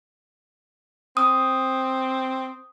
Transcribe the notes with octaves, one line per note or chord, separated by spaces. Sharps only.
C4 D#6